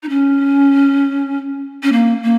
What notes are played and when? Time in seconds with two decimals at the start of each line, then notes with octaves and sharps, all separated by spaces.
0.03 D#4
0.09 C#4
1.83 C#4
1.92 A#3
2.23 A#3